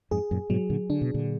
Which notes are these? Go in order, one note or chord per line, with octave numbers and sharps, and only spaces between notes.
F2 G#2 G#4
F#2 A#2
G#2 B2 F#3
A#2 D3
D3 D4
B2
A#2 D3